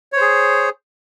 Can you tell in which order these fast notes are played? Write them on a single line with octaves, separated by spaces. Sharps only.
C#5 C5 G#4